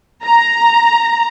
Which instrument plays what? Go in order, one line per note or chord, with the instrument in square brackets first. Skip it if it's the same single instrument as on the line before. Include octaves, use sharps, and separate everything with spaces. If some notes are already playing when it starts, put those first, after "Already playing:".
[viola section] A#5